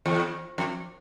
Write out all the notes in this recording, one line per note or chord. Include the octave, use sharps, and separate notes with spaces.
E2
F2